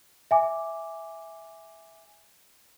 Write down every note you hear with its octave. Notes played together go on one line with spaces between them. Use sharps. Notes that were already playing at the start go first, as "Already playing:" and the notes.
E5 G#5 D6